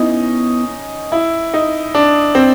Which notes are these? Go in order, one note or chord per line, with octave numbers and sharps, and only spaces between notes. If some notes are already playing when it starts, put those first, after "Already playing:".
Already playing: B3 C#4 D#4 E4
E4
D#4
D4
C4